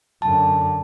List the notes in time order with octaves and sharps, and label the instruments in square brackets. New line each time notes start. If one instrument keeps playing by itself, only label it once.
[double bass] F#2 D3 [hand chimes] A5